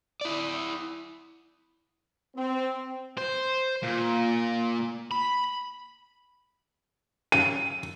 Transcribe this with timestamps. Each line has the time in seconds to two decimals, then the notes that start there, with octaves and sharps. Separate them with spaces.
0.21 E4 D5
2.35 C4
3.17 C5
3.82 A#2
5.11 B5
7.32 D#7